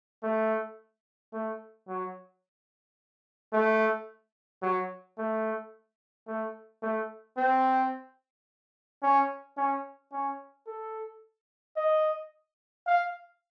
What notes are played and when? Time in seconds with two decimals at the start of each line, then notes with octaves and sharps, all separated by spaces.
0.23 A3
1.33 A3
1.88 F#3
3.53 A3
4.63 F#3
5.18 A3
6.27 A3
6.82 A3
7.37 C4
9.03 C#4
9.57 C#4
10.12 C#4
10.67 A4
11.77 D#5
12.87 F5